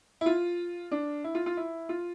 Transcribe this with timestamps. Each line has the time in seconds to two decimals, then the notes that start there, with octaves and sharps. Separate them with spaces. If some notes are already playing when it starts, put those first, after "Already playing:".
0.21 E4
0.26 F4
0.91 D4
1.24 E4
1.35 F4
1.46 F4
1.57 E4
1.89 F4